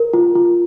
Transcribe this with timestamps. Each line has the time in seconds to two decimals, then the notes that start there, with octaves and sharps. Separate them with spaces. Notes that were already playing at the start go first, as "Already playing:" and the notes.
Already playing: A#4
0.14 F4
0.35 F4